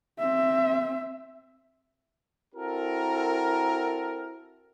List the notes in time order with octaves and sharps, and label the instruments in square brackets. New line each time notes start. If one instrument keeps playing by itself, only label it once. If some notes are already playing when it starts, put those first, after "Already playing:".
[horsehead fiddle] C4 E5
[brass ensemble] C4 E4 F#4 A4 A#4